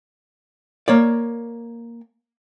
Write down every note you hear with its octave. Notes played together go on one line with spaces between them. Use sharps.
A#3 C#5 D5